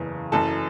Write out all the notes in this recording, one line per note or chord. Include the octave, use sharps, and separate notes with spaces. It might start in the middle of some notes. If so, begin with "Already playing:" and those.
Already playing: F#1 E2 C#3
F#1 F#2 E3 A4 A5